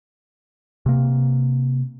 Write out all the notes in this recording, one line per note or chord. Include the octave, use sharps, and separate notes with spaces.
C3 A#3